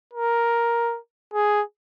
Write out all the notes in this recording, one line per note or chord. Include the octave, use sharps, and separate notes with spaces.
A#4
G#4